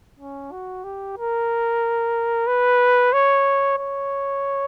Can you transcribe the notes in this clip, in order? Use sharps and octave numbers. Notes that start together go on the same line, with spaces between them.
C#4
F#4
G4
A#4
B4
C#5
C#5